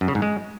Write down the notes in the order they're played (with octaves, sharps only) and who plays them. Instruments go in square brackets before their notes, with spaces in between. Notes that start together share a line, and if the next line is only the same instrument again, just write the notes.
[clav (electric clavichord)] F#2
C#3
G#2
G#3